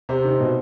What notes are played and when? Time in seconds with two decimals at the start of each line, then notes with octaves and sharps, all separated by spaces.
0.09 C3 C5
0.24 D#3
0.40 B2